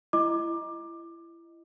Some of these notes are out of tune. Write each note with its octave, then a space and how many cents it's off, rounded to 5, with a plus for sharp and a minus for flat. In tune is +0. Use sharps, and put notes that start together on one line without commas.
E4 +30 D#5 +0 D6 +15